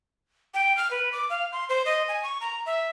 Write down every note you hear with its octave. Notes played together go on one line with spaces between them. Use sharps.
G5
F6
B4
D6
F5
C6
C5
D#5
G#5
C#6
A#5
E5